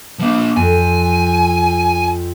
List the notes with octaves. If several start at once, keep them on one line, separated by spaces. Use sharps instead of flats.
F3 A#3
F2 G#5